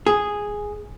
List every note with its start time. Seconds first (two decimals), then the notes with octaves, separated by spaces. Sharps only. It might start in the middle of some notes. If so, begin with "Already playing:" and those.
0.06 G#4